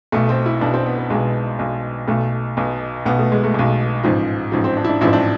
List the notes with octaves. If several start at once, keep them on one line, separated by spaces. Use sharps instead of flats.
B1 B2 A3
C4
E4
B1 B2 D4
C4
B3
B3
B1 B2 G#3
B1 B2
B1 B2 A3
B1 B2
B1 B2 B3
A3
G#3
A3
B1 B2
A1 G#2 F3
A1 G#2 F3
C4
D4
E4
D4
A1 G#2 F3 E4
C4
D4